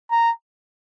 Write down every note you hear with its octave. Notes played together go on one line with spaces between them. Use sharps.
A#5